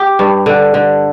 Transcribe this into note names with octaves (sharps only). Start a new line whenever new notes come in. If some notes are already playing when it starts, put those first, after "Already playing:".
Already playing: G4
G2
D3
D3